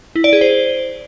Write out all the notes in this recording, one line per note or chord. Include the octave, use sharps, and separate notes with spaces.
E4
D5
G#4
C5